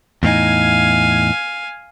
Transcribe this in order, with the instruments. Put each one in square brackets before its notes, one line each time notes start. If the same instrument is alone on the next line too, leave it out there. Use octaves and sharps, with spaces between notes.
[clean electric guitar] E2 A2 D#4 [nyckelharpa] F5 G#5